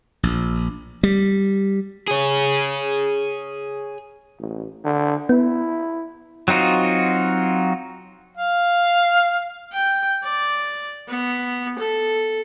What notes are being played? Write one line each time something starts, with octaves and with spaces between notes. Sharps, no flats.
A#1
G3
G#4 C#5
A1
D3
B3 E4
F#3 C4 D#4 F4 F#4
F5
G5
D5
B3
A4